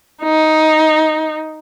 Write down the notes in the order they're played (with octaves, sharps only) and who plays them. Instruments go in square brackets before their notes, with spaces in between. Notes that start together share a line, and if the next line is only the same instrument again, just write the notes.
[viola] D#4